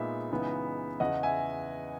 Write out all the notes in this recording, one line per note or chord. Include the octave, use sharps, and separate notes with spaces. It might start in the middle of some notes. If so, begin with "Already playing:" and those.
Already playing: A#2 G#3 B3 D#4 E5
C#2 C#3 E3 B3 D#4
E2 C#3 E3 D#5 F#5
E5 G#5